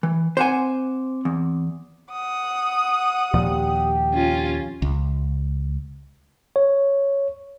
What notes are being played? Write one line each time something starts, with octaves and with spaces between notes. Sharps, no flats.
E3
C4 C5 F#5 G#5 D6
E2
F#5 D#6
D#2 A#2 F3 G4
C#4 F4
C#2
C#5